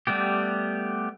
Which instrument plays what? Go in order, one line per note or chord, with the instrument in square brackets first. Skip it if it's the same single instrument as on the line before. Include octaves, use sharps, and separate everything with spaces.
[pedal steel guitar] G3 A3 B3 G4